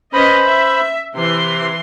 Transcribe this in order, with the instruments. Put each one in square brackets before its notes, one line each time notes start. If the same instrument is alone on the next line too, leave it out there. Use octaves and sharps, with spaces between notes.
[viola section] C#4 B4 D#5 [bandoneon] C5 B5
[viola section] E5
[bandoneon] C3 [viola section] E3 C6